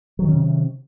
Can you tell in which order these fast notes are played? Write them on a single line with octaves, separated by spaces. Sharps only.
F#3 D#3 C#4 C3